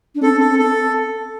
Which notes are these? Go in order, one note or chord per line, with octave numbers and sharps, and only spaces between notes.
D4
C4 A4
C4
A4
C4
A4